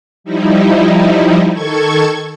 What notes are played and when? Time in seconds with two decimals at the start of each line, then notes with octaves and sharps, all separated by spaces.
0.24 F3 G3 D#4 E4
1.52 D#3 A4 C#6 G#6